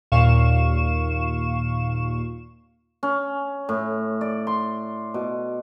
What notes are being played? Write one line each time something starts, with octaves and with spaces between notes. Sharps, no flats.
D#2 A#2 F5 C#6 E7
C#4
A2
D5
C6
B2